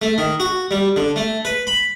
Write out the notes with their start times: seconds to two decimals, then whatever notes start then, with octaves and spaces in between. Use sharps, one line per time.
0.02 A3
0.18 D#3
0.40 F#4
0.71 G3
0.96 D3
1.16 A3
1.45 B4
1.67 B5